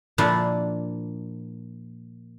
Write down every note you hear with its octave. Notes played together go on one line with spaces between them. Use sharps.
A#2 F3 A#3 D4 E4